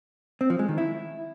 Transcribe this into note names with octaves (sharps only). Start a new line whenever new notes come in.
C4
F3
G#3
D#3
E4